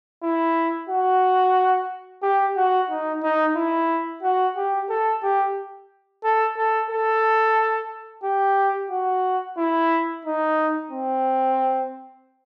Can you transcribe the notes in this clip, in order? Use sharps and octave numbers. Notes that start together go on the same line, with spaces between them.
E4
F#4
G4
F#4
D#4
D#4
E4
F#4
G4
A4
G4
A4
A4
A4
G4
F#4
E4
D#4
C4